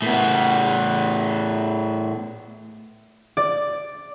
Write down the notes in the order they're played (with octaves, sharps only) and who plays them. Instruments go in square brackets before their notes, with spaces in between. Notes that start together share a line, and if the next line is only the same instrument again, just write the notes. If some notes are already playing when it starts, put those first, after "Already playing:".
[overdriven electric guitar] A2 B3
[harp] D5